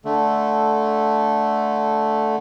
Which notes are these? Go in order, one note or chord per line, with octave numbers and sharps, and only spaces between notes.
D3 A3